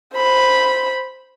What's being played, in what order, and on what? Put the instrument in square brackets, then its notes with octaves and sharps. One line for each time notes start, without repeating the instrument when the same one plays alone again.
[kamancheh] C5 B5